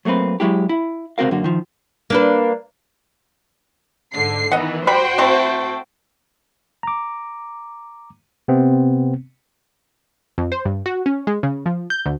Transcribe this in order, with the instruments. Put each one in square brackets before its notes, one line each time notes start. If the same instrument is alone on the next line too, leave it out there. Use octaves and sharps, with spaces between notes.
[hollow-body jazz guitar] F#3 A3 A#3 C4 B4
F#3 G#3 E4 G4
E4
C#2 C3 C4 F#4 A#4 F5
F#2 D3 A#3 F#4
D#3 F3
[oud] A#3 D4 B4
[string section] G#2 D3 C7
[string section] D#3 E3 B3 [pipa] D#5 F#5
[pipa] G3 B5 [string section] F#4 C5 G5
[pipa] A3 C4 E4
[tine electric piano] A#5 D6
C3 B3 C4
[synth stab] F2
C5
G2
F#4
C#4
G#3
C#3
F3
G6
D2